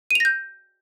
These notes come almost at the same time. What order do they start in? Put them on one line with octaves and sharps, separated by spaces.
D#7 F7 A#6 G6